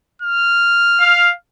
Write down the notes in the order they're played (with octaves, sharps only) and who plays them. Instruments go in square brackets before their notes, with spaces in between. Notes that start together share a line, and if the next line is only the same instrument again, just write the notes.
[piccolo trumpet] F6
[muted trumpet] F5